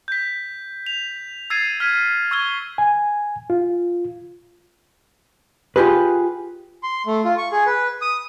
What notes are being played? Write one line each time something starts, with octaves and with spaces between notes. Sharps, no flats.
G6 B6
F7
E6 G#6 A6 C7 D#7
F6 G#6 B6 D#7
C#6 E6 G#6 G7
G#5
F4
F4 G4 G#4 B4
C6
A3
F4
C#6
G#4
B4
D#6